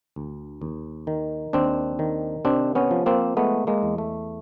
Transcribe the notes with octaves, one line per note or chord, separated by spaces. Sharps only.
D2
D#2
D#3
D#2 C4 D4
D#3
C3 C4 D4
B3 C#4
F3
A#3 C4
G#3 A3 B3
G#3 A#3
E2
A3